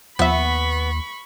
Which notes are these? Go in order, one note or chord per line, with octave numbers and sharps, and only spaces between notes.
D#2 F3 B3 E5 B5 C#6